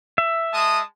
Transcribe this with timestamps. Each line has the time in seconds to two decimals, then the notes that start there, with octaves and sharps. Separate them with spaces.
0.18 E5
0.53 G#3 A5 D#6